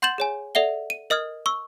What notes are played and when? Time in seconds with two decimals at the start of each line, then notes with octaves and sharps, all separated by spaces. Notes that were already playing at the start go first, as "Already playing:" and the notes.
0.02 F#5 C6 G6 A6 E7 F#7
0.18 G#4 C#5 G#5
0.55 A4 D5 E5 F#5 G7
0.90 D#7
1.10 A#4 D#5 D#6 F6 G#6
1.46 C#6 E6